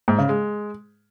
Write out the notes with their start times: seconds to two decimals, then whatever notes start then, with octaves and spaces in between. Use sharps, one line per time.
0.08 G#2
0.18 C#3
0.29 G#3